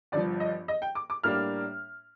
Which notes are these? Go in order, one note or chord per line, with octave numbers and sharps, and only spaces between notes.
G1 G2 F3 D5
D#5
D#5
G5
D6
D6
A2 G3 A#3 D4 F6